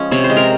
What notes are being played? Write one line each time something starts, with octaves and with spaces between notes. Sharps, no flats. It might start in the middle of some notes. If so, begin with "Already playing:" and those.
Already playing: F3 G#3 C#4
C3 C#5
C5
G#3
A#4